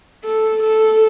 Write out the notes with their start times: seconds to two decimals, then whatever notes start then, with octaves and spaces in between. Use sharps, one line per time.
0.24 A4
0.63 A4